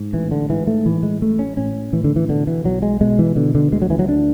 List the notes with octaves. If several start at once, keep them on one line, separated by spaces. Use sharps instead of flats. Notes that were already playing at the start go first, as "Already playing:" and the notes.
Already playing: G#2
A1 E3
D3
G#2 E3
A3
A2 E3
G#3
A1 A3
C#4
A2 C#4
A2 E3
D3
E3
B2 D3
E3
B1 F#3
G#3
B2 G#3
E3
B2 D3
D3
D2 G#3
F#3
E3
F#3
D2 D4